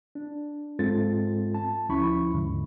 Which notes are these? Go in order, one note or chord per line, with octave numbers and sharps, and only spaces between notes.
D4
G#2 G#3 C4 F4 A4 A6
A5
D2 F3 C#4 E4 B5 C#6
D#2 G#2 D3